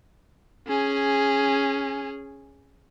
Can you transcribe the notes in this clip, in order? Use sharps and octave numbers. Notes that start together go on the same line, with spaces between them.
C#4 G#4